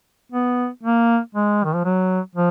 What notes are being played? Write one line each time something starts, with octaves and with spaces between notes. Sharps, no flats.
B3
A#3
G#3
D#3
F3
F#3
F3